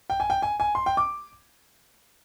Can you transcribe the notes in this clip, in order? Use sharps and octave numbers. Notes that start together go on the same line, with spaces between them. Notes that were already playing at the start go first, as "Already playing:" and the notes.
G5
G#5
G5
G#5
G#5
C6
G5
D6